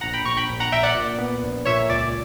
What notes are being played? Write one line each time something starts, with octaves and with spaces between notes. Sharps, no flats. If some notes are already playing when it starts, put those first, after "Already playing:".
A#1 F#5 A#5
G5 B5
A#1 A#5 C#6
G5 B5
A#1
F#5 A#5
A#1 E5 G5
D5 F#5
A#2
B3
A#1
A#2 C#5 E5
C#2 D5